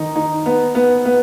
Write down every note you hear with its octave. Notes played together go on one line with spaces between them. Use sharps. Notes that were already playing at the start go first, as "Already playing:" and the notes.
Already playing: D#3 D#4
D#4
B3
B3
B3